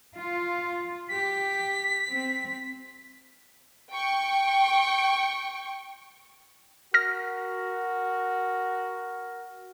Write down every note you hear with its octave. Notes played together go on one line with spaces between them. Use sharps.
F4
G4 B6
C4
G5 C#6
F#4 A#4 F6 A#6